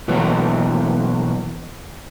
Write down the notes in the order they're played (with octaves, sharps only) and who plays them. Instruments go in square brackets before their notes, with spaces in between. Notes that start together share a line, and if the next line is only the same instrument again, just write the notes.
[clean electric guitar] B2 E3 F#3 A#3 C#5